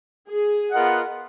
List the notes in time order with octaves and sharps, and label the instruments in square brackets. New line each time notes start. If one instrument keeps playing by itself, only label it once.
[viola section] G#4
[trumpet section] B3 F4 A#4 D#5 F#5